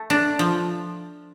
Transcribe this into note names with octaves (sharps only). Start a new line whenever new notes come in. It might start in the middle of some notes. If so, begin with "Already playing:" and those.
Already playing: A3
D4
F3